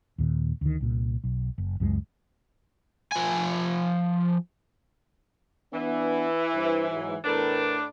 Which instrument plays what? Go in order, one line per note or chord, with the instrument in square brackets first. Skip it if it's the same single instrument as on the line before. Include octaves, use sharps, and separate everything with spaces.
[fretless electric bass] D#2 A#2 D#3
D2 D#3
C2 A#2
B1
F#1
C#2 F#2 F3 G#3
[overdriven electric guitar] F3 G#5
[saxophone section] E3 [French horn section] B3 D4
[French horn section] G2 E4 C5
G#2 F#3
[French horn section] E2 A#4 B4 [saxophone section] A2 D4